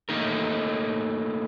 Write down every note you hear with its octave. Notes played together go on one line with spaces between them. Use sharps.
A3 A#3 D#4 A#4